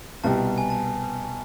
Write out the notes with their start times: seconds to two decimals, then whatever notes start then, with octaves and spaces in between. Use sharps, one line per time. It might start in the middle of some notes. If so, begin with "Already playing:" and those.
0.24 C2 B2 G3 A5
0.58 G#5
0.70 A5